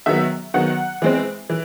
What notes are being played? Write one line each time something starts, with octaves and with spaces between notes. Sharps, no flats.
D#3 F#3 B3 E5
D#3 F#3 B3 F#5
E3 G#3 C4
E3